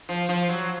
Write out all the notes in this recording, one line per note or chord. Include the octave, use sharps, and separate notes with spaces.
F3
F3
F#3